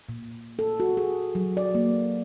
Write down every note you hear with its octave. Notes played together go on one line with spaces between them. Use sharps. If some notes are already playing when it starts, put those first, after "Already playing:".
A#2
A4
F#4
G#4
F#3
D5
A#3